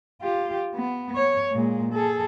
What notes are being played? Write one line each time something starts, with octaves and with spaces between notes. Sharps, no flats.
F4 G4
B3
C#5
A#2 G#3
G#4 A4